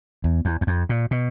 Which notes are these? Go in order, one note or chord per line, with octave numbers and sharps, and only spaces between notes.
E2
E2
E2
F2
A#2
B2